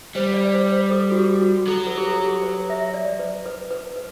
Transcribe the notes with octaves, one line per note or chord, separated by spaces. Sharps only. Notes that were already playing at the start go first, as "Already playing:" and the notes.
G3 C5
D5
C5
C5
A4
F#4
G4
F#4
F#3 A4
B4
G4
A4
G4
B4
E5
D5
B4
B4
B4
B4